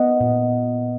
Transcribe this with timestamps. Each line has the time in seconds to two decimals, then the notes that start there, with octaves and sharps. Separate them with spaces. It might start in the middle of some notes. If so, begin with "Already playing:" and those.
Already playing: B3 D#5 F#5
0.20 A#2